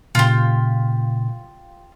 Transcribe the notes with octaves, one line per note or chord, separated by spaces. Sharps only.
A#2 C#3 F4 G4